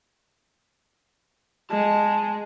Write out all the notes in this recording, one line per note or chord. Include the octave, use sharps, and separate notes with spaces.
G#3 A5